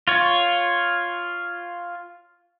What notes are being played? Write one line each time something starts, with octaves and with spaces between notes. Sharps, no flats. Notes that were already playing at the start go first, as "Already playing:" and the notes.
F4 C#5